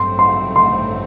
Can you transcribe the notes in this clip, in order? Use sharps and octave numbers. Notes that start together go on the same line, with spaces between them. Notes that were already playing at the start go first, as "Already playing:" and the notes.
Already playing: A1 G2 F#3 A3 C4 C6
C6
C6